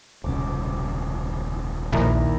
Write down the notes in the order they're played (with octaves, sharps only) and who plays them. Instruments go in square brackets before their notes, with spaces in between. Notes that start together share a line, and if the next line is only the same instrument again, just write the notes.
[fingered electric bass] D#1 C2 C#3 [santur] D6
[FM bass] A#1 [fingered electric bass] D#2 [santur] E4 A#4 D5